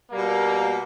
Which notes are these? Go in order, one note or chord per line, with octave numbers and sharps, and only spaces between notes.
B2 G3 A#3